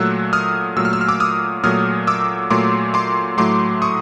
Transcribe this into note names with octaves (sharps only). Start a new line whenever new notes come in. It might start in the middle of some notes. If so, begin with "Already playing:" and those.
Already playing: A#2 F#3 A3 E6 F#6
D#6 F6
A#2 F#3 A3 E6
F6
E6
F6
D6 E6
D#6 F6
A#2 F#3 A3 D#6 F6
D6 E6
A#2 F#3 A3 C6 D6
C6 D6
A2 F#3 A3 C6 D6
C#6 D#6